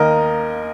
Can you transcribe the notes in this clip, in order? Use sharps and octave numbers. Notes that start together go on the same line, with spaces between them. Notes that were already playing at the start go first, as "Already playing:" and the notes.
Already playing: D#2 D#3 A#3 A#4 D#5